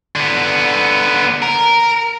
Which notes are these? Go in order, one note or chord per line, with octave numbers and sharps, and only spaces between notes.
D3 B3
A#4